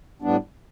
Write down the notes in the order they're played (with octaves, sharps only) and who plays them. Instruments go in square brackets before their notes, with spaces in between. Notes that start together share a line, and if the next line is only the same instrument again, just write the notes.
[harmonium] A2 G3 B3 D4